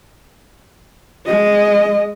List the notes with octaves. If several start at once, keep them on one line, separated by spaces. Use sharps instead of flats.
G#3 D#5